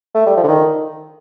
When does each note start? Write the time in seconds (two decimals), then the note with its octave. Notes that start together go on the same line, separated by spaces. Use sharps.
0.15 A3
0.26 G3
0.37 F3
0.43 D3
0.48 D#3